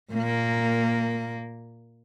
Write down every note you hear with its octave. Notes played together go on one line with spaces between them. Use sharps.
A#2 A#3